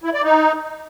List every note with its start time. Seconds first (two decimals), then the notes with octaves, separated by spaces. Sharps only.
0.04 E4
0.14 D5
0.24 D#4